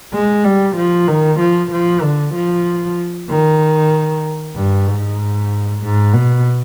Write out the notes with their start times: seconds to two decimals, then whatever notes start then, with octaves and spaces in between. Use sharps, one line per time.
0.13 G#3
0.44 G3
0.76 F3
1.07 D#3
1.40 F3
1.71 F3
2.02 D3
2.34 F3
3.29 D#3
4.55 G2
4.87 G#2
5.81 G#2
6.13 B2